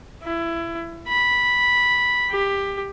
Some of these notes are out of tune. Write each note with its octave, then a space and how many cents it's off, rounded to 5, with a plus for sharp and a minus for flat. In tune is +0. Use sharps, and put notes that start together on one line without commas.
E4 +25
B5 -5
G4 +15